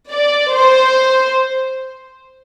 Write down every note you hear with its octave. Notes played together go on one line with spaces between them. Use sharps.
D5
C5